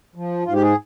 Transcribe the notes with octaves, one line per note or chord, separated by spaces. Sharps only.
F3
G#2 F4
G4
G#4